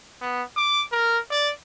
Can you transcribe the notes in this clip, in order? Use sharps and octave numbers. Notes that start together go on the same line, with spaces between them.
B3
D6
A#4
D5